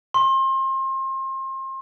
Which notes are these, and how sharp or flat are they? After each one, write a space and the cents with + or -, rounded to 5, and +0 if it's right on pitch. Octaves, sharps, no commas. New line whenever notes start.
C6 +35